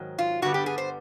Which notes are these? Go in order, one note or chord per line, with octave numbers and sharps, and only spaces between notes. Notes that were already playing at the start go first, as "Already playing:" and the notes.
Already playing: G#2 D#3 F#3
F4
G2 D3 G3 B3 F#4
G4
G#4
C5